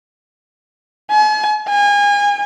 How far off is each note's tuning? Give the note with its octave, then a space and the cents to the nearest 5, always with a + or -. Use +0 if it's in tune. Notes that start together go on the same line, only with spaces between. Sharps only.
G#5 +45
G#5 -30